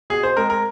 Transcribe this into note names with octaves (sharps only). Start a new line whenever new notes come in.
B2 G#4
C5
G#3 C4 A#4
A#4